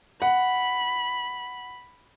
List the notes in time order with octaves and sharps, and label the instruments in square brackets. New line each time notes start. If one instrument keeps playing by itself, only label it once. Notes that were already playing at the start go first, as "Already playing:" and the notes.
[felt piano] F#5 [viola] B5